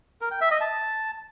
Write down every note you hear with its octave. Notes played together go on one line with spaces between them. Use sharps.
A#4
G5
E5
D#5
A5